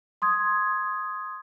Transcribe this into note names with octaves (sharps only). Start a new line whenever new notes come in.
C6 D#6 G#6